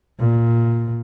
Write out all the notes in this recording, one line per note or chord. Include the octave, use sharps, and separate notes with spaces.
A#2